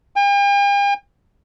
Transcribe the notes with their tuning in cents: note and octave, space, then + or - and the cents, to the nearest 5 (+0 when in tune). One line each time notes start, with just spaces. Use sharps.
G5 +45